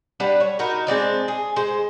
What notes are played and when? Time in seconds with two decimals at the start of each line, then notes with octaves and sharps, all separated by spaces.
0.20 G3 D4 B4 F#5
0.40 C#5
0.59 D#4 F#4 A#4 B4
0.87 G#3 C4 D4 D#4
1.28 G#4
1.56 G#3 C5